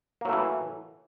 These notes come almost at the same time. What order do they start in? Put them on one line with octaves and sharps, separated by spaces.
A#3 F#3 A3 E3